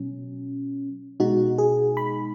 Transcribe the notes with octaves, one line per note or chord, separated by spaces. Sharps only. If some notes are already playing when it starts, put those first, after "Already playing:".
Already playing: B2 F#3 C#4
B2 G#3 D#4 F#4
G#4
B5